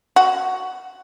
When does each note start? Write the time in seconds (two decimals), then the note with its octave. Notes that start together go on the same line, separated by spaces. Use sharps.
0.16 F#4